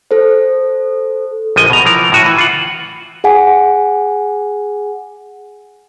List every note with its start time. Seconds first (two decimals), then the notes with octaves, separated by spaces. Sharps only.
0.11 A4 C5
1.56 A#1 F3 D#5 G#5
1.70 B2 A#5
1.85 E3 F3 A#4
2.12 A2 F#4 G#5
2.26 E3
2.38 F4 F#5
3.24 G#4 F#5 G#5